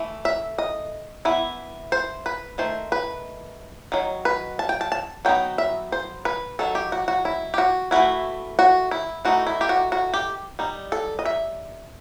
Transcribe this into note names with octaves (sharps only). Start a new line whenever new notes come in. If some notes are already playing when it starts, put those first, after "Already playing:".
Already playing: E3 A3
E5
D#5
E3 B3 E4
C5
B4
D#3 A3 C5
B4
D#3 F#3
B4
A5
G5
A5
A5
F#3 B3 D#4 G5
E5
C5
B4
D#3 F#3 A4
G4
F#4
F#4
E4
G4
F#4
E3 A3 E4 F#4
F#4
E4
E3 A3 D#4 F#4
E4
G4
F#4
F#4
G4
G3 D#4
A4
D#5
E5